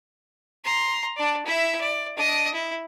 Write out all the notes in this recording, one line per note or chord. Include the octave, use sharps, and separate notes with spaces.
A#5 C6
D4 D5
E4 E5
D5
D4 D#5
E4